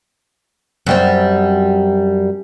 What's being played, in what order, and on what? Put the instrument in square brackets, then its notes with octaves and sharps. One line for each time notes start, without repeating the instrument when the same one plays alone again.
[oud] F#2 G3 C4